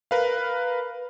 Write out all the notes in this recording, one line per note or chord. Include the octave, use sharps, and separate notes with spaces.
A#4 B4 F5